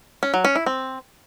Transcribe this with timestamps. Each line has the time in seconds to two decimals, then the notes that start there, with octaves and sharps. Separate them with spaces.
0.23 C#4
0.34 F#3
0.45 C#4
0.55 E4
0.66 C4